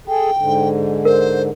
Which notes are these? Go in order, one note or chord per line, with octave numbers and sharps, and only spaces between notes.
G#4 A4 G5
G#2 D3
A#4 C5